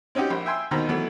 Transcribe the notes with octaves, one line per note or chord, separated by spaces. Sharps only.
C4 C#4 D#4 F#4 G4
A#1
E5 G5 G#5 C6 E6
D#2 B2 D#3 C5 A#5 B5
E3 F#3 A3 B3